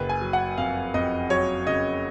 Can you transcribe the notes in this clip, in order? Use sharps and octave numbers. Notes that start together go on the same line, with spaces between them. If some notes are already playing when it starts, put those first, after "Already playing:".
Already playing: F#1 B4
G#5
F#3
F#5
F2 F5
F2 D#5
F#3 C#5
C#3 D#5